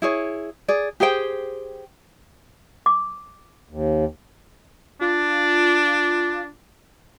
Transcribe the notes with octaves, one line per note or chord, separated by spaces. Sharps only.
E4 G#4 C#5
G#4 D5
G4 G#4 C5 G5
D6
D#2
D4 F4